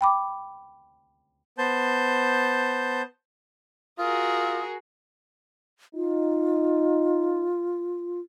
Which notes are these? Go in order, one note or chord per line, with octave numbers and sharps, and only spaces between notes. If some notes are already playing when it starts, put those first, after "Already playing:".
G5 B5 D6
B3 C5 A5 G6
F4 F#4 G#4 A#4 D#6
D#4 F4